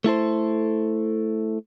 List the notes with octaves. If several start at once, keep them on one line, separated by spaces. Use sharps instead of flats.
A3 E4 A4 C5